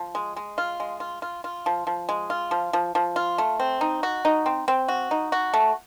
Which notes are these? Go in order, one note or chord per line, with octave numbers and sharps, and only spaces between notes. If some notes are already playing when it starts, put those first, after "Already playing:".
Already playing: F3
G#3
G#3
F4
G#3
F4
F4
F4
F3
F3
G#3
F4
F3
F3
F3
F4
A3
C4
D#4
F#4
D#4
C4
C4
F#4
D#4
F#4
A3